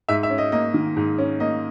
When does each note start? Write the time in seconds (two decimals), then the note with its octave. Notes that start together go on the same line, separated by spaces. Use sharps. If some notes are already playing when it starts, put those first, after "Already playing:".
0.09 G#2 E5
0.23 E5
0.30 C#4
0.38 D#5
0.52 A#3 D#5
0.74 D#3
0.97 G#2
1.18 C#4
1.40 A#3 D#5